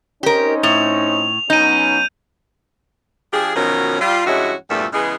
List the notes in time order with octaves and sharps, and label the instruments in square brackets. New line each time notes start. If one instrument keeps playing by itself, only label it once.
[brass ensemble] C4 C#4 D#4 [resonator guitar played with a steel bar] G4 A#4
[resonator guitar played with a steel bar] A2 [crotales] F7
[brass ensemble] F#3 B3 C#4 [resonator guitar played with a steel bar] D#4 [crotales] G6 D#7
[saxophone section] F3 D4 G4 G#4
B2 D#3 F3 F#3 C#4 A#4
G3 F4
G2 E3 G#3 C#4 F#4 E5
E2 G2 A#2 F3 A3
C#3 E3 G#3 B3 G#4